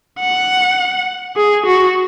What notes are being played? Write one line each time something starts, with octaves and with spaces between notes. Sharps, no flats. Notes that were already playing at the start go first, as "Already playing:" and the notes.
F#5
G#4
F#4